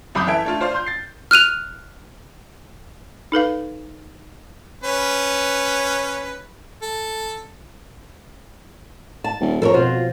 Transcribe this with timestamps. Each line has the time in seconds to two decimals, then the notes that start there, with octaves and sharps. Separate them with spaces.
0.15 C2 F#2 B5 D6 D#6 G6
0.27 E3 A4 E5 G#6 D7
0.44 A3 D4 F4
0.61 F4 C5 D5 F5
0.74 C6 G6
0.86 A6 C7
1.31 F6 F#6 D#7 F7
3.32 D#4 A4 B4 F5
4.84 C#4 B4
6.82 A4
9.24 A5
9.40 D#1
9.62 F2 F3 A4 A#4 C#5
9.74 B2 F4 F#4 C5